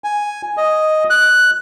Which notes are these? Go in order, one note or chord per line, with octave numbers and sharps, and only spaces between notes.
G#5
D#5
F#6